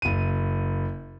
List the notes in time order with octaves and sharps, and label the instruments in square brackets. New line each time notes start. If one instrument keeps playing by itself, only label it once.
[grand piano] F#1 D#7